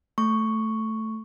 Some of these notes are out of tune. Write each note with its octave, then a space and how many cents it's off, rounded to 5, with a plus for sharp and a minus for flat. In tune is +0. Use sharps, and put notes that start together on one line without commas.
A3 +0 C#6 +0